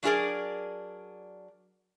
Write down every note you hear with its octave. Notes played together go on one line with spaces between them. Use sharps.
F#3 D4 F4 G#4 A#4 D5